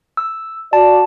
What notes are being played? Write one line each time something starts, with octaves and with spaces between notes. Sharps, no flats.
E6
F#4 D5 A5